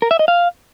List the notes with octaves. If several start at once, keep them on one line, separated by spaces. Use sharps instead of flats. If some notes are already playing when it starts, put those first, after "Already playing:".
A#4
E5
D#5
F5